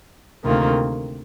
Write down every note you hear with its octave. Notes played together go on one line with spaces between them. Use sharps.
D2 C3 D#3 A#3 F4